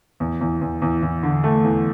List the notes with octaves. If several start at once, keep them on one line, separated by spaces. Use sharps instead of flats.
E2
E2
E2
E2
E2
D3
A3
E2